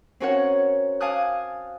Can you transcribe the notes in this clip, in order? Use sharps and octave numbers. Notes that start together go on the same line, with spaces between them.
C4 C#4 F#4 A#4 C#5 F#5
F5 G#5 A5 D6 D#6 F#6